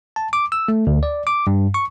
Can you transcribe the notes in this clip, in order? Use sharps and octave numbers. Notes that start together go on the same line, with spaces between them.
A5
D6
E6
A3
D2
D5
D6
G2
C#6